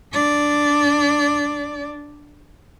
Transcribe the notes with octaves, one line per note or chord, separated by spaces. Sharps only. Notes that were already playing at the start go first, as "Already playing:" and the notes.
D4 D5